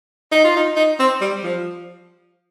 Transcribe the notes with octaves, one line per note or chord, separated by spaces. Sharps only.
D#4
F4
D#4
D#4
C4
G3
F3